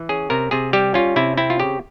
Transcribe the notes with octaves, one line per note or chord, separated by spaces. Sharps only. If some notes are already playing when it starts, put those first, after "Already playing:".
Already playing: E3
C#4 G#4
C3 A#4
C3 G#4
G3 G4
C#4 F4
C3 E4
C4 E4
F4
C#3 G4